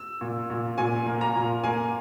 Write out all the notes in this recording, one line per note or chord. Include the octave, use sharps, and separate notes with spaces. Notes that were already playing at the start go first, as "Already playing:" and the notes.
Already playing: E6
A#2
A#2
A#2 G#5
A#3
A#5
A#2
A#3 G#5